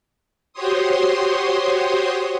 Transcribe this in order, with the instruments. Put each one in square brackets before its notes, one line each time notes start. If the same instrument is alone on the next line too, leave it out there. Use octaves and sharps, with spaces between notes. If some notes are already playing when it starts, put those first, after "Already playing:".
[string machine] F#4 G4 C5 C#5 C6 D#6